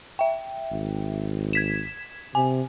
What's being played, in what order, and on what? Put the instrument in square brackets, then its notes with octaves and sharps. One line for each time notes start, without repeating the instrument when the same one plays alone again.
[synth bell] E5 G5
[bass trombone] G#1
[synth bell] G#6 B6 E7
[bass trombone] C3 [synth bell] G#5